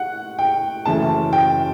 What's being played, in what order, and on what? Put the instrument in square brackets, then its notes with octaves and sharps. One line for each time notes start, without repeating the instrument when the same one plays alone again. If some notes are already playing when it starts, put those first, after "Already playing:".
Already playing: [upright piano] F#5
G5
F#1 F#2 E3 A3 A5
G5